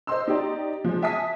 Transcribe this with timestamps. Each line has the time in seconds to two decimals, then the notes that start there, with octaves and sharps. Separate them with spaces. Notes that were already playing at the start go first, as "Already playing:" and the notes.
0.07 C5 D#5 C6 E6
0.28 D#4 G4 D5
0.84 F3 G#3
1.02 E5 G#5 A5 D#6 B6